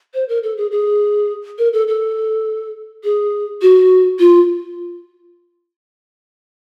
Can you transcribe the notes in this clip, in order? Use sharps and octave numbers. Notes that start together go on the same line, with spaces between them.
C5
A#4
A4
G#4
G#4
A#4
A4
A4
G#4
F#4
F4